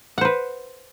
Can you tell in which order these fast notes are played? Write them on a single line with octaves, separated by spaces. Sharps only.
F#5 C5 B4